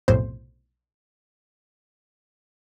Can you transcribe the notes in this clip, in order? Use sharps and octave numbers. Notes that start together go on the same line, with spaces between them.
B1 F2 A2 C3 C5